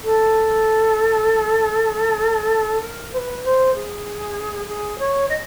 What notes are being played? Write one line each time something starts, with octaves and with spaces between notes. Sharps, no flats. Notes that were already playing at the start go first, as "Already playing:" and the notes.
A4
A#4
C5
B4
C5
G#4
G#4
C#5
D#5